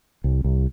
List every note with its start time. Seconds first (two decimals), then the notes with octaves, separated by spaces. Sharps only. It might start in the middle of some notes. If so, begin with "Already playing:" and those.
0.24 C2
0.44 C2